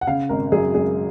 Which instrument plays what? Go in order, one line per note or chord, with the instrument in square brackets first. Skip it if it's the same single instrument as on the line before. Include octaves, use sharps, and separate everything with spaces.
[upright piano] F#5
C#3 F5
G#1 A#4
F#2 G#4
F#2 G#4